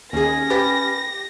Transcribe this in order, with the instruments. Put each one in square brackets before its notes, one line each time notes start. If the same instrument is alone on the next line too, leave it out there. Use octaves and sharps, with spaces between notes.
[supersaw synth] D#2 G#4 [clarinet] C#4 [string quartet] A#6
[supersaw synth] G4 [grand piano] B4 A6 B6